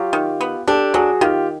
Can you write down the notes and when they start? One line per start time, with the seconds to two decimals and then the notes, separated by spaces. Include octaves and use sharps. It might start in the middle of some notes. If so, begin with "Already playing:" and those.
Already playing: F#3 F4 G4
0.13 D#3
0.41 B3
0.68 D4 G4 A4
0.94 F#3 F#4 G#4
1.21 D#3 F4 G4